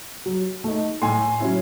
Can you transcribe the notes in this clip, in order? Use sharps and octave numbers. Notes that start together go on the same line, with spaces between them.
F#3
A3 D#4
A2 G#5 C6
F#3 C#4 E4